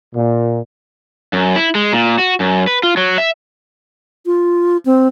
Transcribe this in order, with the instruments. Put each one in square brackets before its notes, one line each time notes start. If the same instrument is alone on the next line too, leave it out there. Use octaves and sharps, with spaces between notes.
[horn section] A#2
[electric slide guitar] F#2
E4
G#3
A#2
F#4
F#2
B4
F4
F#3
E5
[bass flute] F4
C4